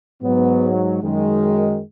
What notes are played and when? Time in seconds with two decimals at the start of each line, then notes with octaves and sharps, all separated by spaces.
0.22 G#2 F#3 B3
1.01 F#2 D#3 G#3